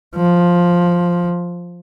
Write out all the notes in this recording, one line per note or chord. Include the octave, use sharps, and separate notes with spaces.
F3